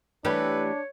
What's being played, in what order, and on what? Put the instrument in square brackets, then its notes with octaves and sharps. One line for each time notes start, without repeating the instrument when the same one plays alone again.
[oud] E3 A3 G4 [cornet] D4 [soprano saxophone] B4 [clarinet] C#5